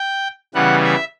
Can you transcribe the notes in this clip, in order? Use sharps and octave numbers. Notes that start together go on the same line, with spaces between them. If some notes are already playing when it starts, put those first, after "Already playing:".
Already playing: G5
C#3 E3 G3 B3 F#5
E5